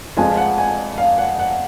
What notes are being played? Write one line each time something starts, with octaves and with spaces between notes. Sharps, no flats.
F1 F2 F3 G#3 G#5
F#5
G#5
F5
F#5
F#5